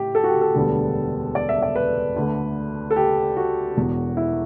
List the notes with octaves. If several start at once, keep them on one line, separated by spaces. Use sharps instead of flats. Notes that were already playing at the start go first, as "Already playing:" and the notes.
Already playing: A2 G4
A4
F#4
G4
A4
E1 D2 D3 G3 B3
D5
E5
D5
B4
D2 D3 A3
A4
G4
F#4
E1 E2 B2
E4